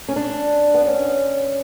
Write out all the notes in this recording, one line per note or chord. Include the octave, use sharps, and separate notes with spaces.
C#4
D4
B3
C#4